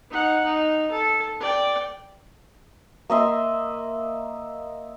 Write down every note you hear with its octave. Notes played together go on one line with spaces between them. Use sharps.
D#4 F#5
D#4
A4
D5 G5
A#3 D#5 E5 C6